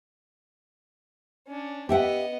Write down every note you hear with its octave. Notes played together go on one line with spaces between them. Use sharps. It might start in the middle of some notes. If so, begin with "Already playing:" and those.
C#4 D4
B3 G4 D#5 E5 F#5